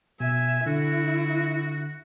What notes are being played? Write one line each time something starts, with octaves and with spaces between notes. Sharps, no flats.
B2 E5 G#5
D3 E4 F#4